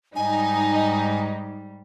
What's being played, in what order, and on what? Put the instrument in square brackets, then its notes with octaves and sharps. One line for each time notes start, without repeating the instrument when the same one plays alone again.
[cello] G#2 G3 [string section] D#4 [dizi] G#5